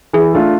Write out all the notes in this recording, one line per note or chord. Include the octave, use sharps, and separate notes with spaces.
E3 G#4
A3 D4 F4 A4